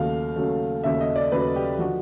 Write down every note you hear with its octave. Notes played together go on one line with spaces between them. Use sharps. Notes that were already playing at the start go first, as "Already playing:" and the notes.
Already playing: D#2 C#3 F#3 A3 F5
D#2 C#3 F#3 A3
D#2 C#3 F#3 A3 E5
D#5
D5
D#2 C#3 F#3 A3 B4
G4
D3 F3 F#4